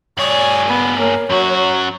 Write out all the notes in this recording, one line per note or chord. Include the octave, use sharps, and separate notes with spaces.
G2 G#4 C#5 D5
B3
A#3 C#5
F#2 F#3 F#4